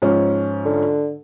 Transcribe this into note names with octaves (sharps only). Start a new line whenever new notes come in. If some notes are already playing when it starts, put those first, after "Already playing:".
G#2 F3 C#4
D3